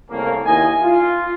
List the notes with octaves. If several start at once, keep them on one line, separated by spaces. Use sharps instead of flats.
C2 A2 C#3 A#3
D#2 E4 D#5 G#5
F4